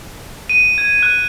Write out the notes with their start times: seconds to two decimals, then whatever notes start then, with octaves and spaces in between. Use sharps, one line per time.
0.49 D#7
0.78 G#6
1.03 F#6